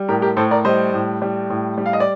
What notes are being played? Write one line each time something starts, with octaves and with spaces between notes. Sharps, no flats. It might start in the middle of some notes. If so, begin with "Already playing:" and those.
Already playing: G3
A2 G4 A#4
G4 A#4
A2 A4 C5
A#4 D5
G3 C5 D#5
A2
G3
A2
G3
F5
D#5
D5